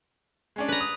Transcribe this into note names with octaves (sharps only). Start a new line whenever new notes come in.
G#3 C#4 D4
B4 A#5
D#6